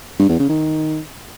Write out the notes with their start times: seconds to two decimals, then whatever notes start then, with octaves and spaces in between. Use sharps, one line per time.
0.19 G2
0.29 E2
0.39 C#3
0.49 D#3